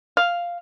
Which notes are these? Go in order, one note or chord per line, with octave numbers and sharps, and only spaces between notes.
F5